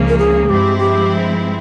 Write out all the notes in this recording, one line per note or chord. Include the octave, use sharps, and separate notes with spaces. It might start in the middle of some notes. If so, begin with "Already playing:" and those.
Already playing: C#2 C#3 F3 A#3
A#4
G#4
G2 F3 G#3 C4 E4 G4
G4